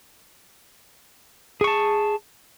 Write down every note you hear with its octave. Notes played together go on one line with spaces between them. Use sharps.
G#4 A5 C#6